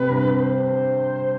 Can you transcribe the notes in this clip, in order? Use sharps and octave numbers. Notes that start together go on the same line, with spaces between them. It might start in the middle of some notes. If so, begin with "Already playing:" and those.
Already playing: C3 B4
G2
C5